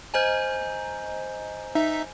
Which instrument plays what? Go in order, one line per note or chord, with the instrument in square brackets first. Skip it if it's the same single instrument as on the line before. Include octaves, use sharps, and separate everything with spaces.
[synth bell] C5 D#5 A#5 [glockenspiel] G#5 G6
[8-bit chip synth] D#4 E5